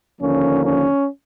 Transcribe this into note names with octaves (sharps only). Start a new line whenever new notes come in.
D#2 D3 F3 A#3 C#4
C#4